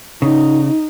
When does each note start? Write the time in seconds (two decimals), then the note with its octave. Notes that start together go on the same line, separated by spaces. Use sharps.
0.22 C#3 D#4